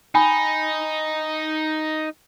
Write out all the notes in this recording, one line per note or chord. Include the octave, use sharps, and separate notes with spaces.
D#4 G5 G#5 B5